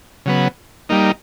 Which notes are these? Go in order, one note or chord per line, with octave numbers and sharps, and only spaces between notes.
C#3 F#3 B3
G3 A#3 D#4